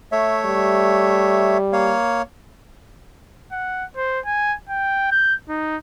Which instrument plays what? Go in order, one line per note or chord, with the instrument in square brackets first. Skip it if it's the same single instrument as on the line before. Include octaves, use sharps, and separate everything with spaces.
[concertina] A3 C#5 E5
[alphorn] G3
[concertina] A#3 C#5 F5
[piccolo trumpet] F#5
C5
G#5
G5
G6
D#4